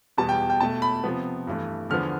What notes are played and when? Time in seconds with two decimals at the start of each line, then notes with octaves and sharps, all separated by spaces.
0.17 E2 B2 G3 B3 A5
0.29 G5
0.50 G5
0.60 B2 A3 A5
0.82 B5
1.04 C3 F3 B3
1.47 G2 E3 A3
1.89 E2 D3 F3 B3 F6